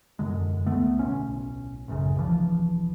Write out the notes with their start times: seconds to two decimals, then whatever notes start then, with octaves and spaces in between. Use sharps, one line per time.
0.19 E1 F#2 D3 G#3
0.66 C#2 D3 A3 B3
0.99 D1 B1 C#4
1.88 A1 F#2 C#3
2.16 E1 C2 E3 F3